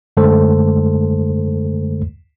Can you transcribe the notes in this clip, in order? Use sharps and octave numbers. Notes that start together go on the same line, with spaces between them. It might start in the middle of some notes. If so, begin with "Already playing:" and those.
F#2 D3 G#3 A3 A4 C5